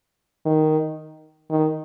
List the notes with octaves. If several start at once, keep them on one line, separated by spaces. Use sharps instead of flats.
D#3
D#3